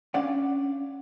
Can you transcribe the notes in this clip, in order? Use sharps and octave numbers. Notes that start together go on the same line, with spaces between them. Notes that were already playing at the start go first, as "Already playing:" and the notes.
C#4 D4 D5 F5 F#5